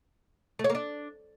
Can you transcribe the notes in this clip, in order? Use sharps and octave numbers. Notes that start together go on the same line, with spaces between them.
A3
C#5
A#3
D4